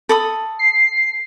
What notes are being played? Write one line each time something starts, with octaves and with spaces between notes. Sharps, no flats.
A4 B5 D#6
C7